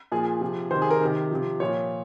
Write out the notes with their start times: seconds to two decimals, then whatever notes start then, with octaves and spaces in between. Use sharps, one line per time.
0.12 A#2 F3 G#4
0.41 C3 F3
0.71 C3 D#3 C5
0.82 G#4
0.91 A#4
1.01 C3 D#3
1.31 C3 F3
1.60 A#2 F3 C#5